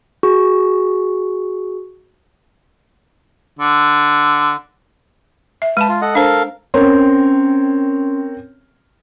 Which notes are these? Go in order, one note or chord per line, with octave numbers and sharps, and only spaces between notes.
F#4 G#4 C#6
D3
E5
G#3 B4 A5
F4
A4 D#5 F#5
D4 A4 A#4 C5 F5
C4 C#4 A#4 C#5 C6